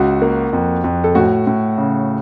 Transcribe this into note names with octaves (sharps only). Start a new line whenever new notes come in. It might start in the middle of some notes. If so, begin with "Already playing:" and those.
Already playing: C#2 F#4
A#3
F2
F2
A4
A2 F#4
A2
C#3